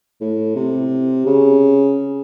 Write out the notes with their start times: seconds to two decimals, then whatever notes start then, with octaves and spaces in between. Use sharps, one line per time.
0.21 A2
0.56 C3
1.26 C#3